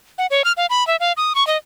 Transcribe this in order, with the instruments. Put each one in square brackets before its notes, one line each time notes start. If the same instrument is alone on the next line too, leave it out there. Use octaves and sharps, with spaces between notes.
[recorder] F#5
C#5
F6
F5
B5
E5
F5
D#6
C#6
D#5